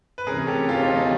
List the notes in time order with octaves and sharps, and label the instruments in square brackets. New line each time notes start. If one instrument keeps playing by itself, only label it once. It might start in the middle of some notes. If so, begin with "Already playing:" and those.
[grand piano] B4
[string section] D2 C3 E3 A3 C#4 [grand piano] G#4 A#4
[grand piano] G4 A4
F4 G4
D#4 F4
D#4